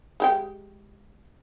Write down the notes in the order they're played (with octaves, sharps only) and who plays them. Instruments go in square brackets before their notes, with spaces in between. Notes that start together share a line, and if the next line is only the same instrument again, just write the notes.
[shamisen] G#3 G4 G5